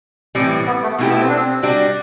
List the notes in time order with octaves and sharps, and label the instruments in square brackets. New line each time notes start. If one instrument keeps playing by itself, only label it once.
[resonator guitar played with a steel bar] A2 E3 G3 C4
[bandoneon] B3
A3
[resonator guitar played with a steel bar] B2 A3 E4 G4
[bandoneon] B3
C4
D4
C4
[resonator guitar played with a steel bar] G3 D4 F#4